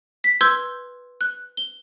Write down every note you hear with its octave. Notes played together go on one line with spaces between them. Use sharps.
B6
B4 C6 E6 G6 G#6
F#6
G7